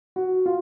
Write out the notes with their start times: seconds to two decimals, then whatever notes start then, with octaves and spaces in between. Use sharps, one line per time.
0.16 F#4
0.46 F4